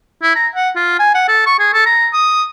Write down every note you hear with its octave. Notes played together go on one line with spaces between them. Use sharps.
E4
A#5
F#5
F4
G#5
F#5
A4
C#6
G#4
A4
A#5
D#6